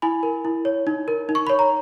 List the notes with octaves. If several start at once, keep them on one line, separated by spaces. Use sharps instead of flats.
E4 G#5 B5
A#4
E4
C#5
D#4
A#4
D#4
C#6
C#5 B5
A#5